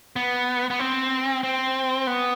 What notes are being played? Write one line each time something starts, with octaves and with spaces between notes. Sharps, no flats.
B3
B3
C4
C4
B3